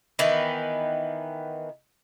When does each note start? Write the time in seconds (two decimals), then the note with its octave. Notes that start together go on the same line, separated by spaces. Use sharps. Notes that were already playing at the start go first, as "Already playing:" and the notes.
0.19 D#3 E3 B3